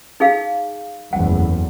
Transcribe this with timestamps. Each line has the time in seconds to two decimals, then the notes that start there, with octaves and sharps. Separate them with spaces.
0.20 D#4 G#4 F5
1.13 F#1 E2 A2 F#5